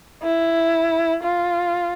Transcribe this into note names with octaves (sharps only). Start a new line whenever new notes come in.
E4
F4